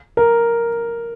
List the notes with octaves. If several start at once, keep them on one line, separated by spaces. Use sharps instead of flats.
A#4